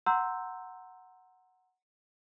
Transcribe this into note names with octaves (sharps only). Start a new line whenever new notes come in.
F#5 A#5 C6 E6 G6